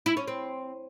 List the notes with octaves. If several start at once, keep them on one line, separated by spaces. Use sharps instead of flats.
E4
C#4
C4